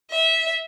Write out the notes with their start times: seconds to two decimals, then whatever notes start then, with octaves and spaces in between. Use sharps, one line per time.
0.10 E5